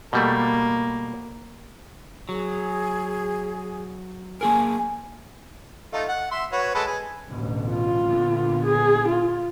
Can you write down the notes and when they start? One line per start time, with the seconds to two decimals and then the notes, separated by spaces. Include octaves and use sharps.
0.13 B2 G3 A3 A#3
2.29 F#3 G#4
4.41 A#3 G#4 A#4 G#5
5.93 A3 D#4 F4
6.08 F#5
6.31 E5 C6
6.52 F#4 B4 C#5
6.75 G#3 A4 B4
6.87 G#4
7.29 A1 D2 B2
7.69 F4
8.06 A#2 D3 B3
8.65 G#4
9.08 F4